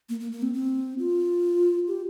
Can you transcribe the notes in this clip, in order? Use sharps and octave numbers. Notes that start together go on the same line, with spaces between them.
A#3
A#3
A#3
C4
C4
F4
G4